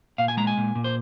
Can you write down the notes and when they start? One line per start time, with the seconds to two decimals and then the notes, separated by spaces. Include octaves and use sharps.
0.18 A#2 F5
0.28 G#5
0.37 G#3 A#5
0.47 G#5
0.57 A#2
0.75 A#2
0.84 C5